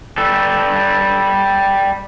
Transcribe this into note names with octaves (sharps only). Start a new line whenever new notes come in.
G3 A4